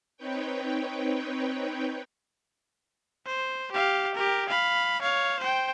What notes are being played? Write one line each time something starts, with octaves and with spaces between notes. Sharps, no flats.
C4 D#4 B4 C#5 G5
C5
G4 F5
G4 A#4
F5 B5
C#5 F5
C5 G5